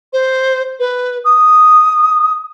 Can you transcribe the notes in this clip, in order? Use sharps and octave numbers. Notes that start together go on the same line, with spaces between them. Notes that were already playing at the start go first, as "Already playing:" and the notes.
C5
B4
D#6